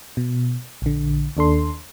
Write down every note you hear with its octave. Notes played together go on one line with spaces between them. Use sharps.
B2
A#1 D3
D#2 D4 A4 C6